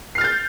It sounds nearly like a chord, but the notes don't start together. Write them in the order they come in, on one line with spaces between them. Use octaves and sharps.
C7 F6 A6 G6